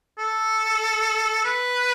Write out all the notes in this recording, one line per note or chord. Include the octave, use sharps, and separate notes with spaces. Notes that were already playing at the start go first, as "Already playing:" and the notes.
A4
B4